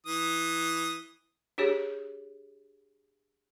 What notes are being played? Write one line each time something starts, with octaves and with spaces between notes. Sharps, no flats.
E3 D#6
D4 G4 G#4 C#5